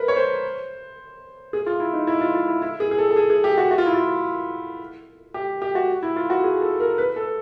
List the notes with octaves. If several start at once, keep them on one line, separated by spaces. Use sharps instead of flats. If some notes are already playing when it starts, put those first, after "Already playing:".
Already playing: A#4 B4
C#5
C5
G#4
F4
E4
D#4
E4
F4
F4
E4
E4
G#4
G#4
A4
A4
G#4
G#4
G4
F#4
F#4
F4
E4
F4
G4
G4
F#4
E4
F4
F#4
G#4
A4
A#4
B4
A4